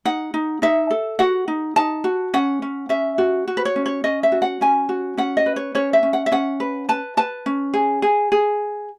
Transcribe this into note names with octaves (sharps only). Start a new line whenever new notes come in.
D#4 F#5
D#4
D#4 E5
A4
F#4 F#5
D#4
D#4 A5
F#4
C#4 F#5
C#4
C#4 E5
F#4
F#4
B4
C#5
C#4
C#5
C#4 D#5
E5
F#4
F#5
C#4 G#5
F#4
C#4 F#5
D#5
B4
C#5
C#4 C#5
E5
C#4
F#5
E5
C#4 F#5
B4
B4 A5
B4 A5
C#4
G#4
G#4
G#4